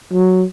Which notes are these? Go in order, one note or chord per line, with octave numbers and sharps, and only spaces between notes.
F#3